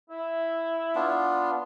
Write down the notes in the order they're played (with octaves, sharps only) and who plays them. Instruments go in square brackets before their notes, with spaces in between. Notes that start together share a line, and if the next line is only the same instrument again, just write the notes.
[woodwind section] E4
[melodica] B3 D4 F4